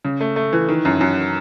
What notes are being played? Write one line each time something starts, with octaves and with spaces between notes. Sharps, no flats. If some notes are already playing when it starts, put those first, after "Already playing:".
C#3
A3
A3
E3
D#3
F#2
F#2